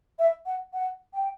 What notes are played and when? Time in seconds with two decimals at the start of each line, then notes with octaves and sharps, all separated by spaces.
0.19 E5
0.46 F#5
0.73 F#5
1.13 G5